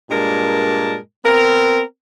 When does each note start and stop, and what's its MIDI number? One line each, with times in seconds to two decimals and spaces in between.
0.10 0.97 43
0.10 0.97 46
0.10 0.97 56
0.10 0.97 70
0.10 0.97 81
1.25 1.82 59
1.25 1.82 60
1.25 1.82 70